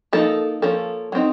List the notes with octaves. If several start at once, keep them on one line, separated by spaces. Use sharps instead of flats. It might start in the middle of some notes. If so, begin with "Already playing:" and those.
F3 A#3 D#4 A4
F3 A#3 C#4 A4
F#3 C4 D#4